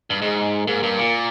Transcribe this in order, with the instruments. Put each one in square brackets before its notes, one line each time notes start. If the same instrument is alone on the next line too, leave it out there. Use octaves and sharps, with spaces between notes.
[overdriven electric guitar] G2
[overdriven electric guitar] G#2 [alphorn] G#3
[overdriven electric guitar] G#2 [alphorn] A#3
[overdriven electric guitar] G2
A#2